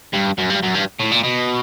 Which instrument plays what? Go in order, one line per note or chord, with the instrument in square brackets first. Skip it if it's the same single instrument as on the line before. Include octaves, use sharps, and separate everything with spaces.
[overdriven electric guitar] G2
F#2
G2
F#2
G2
A2
A#2
B2